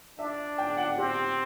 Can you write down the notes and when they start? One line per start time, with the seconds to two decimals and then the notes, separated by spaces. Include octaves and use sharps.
0.19 D4 E5
0.58 G5
0.77 F#5
0.98 C4 G4